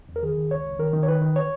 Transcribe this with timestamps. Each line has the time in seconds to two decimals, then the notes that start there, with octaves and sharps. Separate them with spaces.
0.09 E2
0.16 A#4
0.23 D#3 G#4
0.37 D#3
0.51 C#2 C#5
0.65 C#2
0.79 D#3 A#4
0.93 D#3
1.03 C#5
1.08 D#3 B4
1.21 D#3
1.36 C#5